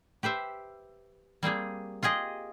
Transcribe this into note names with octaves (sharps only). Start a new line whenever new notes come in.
G4 B4 C5 E5
G3 A#3 C4 G#4
F4 G4 G#4 D#5